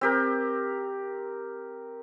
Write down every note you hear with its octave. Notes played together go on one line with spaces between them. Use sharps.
C4 G4 A#4